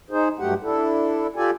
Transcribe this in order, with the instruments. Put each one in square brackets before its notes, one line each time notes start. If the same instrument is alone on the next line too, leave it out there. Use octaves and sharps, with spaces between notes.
[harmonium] D#4 G#4 C5
G2 F#3 A3 G4 F#5
D4 E4 A4
F4 G4 A4 D5 G#5